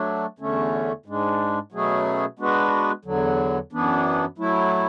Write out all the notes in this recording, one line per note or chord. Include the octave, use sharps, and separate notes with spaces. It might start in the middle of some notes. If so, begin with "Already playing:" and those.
Already playing: F#3 A3 D4
E2 D3 A3 C#4
G#2 G#3 D4
B2 F#3 A3 C#4 G#4
G#3 B3 D4 F#4 B4
E2 D3 F#3
F#2 E3 B3 D4
F#3 A3 E4